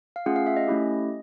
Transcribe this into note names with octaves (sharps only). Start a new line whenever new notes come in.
F5
A3 C#4 F4 G#4 F#5
F5
E5
D#5
A3 C#4 E4 G4